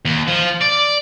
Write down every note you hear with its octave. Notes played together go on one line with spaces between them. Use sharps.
D#2
F3
D5